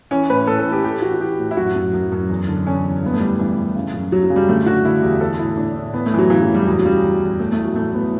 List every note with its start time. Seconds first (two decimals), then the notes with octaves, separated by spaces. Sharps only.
0.11 E3 C#4
0.29 A2 B4
0.47 A2 A4
0.59 A4
0.67 E3
0.72 G4
0.84 E3 G4
1.02 E3 F#4
1.14 F#4
1.20 E3 G4
1.39 A2
1.51 E4
1.57 F#2 F#4
1.75 F#2
1.94 F#2
2.12 F#2
2.30 E2
2.48 D3
2.67 D3 C#4
2.84 E2
3.02 G2 B3
3.13 A3
3.20 E3 G3
3.39 G2 E3
3.58 E3
3.76 C#3
3.93 F#2
4.12 F#2 F#3
4.24 F#3
4.30 C#3
4.36 G3
4.49 D3 A3
4.66 D3 F#4
4.85 D3 E4
5.02 E2 G4
5.21 E3 A4
5.39 A2 E4
5.57 A2 D4
5.76 A2
5.94 E3 B3
6.06 A3
6.13 F#2 E3
6.19 F#3
6.30 C#3 E3
6.42 F#3
6.48 F#2
6.54 G3
6.66 E2 F#3
6.79 F#3
6.85 C#3 G3
7.03 E2
7.21 E2
7.39 A2 A3
7.52 A3
7.57 A2
7.64 F#3
7.76 E3 A3
7.94 A2 B3